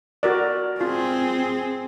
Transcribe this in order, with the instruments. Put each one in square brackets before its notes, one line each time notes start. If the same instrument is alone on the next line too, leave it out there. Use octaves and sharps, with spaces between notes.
[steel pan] F#4 A#4 D5
[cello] C4 G#4 [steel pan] F4